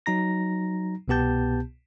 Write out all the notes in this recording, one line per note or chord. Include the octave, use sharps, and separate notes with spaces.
F#3 D#4 A#5 A#6
C2 B2 B3 G4 A5 G6